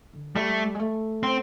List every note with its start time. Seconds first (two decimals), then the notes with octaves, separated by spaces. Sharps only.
0.13 D3
0.35 G3 A3
0.75 G#3
0.79 A3
1.23 C4